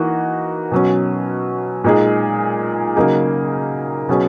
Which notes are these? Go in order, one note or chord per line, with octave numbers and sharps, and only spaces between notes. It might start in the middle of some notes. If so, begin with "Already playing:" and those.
Already playing: E3 A#3 D#4 F#4
B2 F#3 C#4
A#2 G#3 D#4 G#4
C#3 F#3 A#3 D#4 G#4
B2 F#3 C#4 G#4